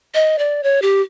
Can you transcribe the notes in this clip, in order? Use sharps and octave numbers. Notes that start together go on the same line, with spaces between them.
D#5
D5
C#5
G4